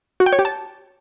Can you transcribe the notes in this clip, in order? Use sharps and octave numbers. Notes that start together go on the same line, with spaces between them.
F#4
G5
C#5
G4
A5